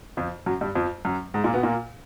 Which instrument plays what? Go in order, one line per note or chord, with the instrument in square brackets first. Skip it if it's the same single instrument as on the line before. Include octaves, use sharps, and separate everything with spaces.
[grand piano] F2 F3
F#2 F#3
G2 G3
F2 F3
F#2 F#3
G#2 G#3
A#2 A#3
B2 B3
A#2 A#3